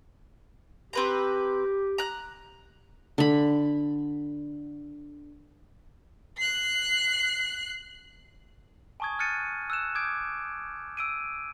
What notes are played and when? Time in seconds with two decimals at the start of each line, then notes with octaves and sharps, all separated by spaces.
0.93 C4 G4 B4 A#5
1.98 A#5 F#6
3.18 D3 B5
6.37 F#6 C7
9.00 G#5 A5 C#6 D#6 G#6
9.19 F6 F#6 G#6 A6 C#7 D#7
9.70 E6 F#6 E7
9.95 D6 D#6 G6 G#6 D7
10.97 E6 D7 D#7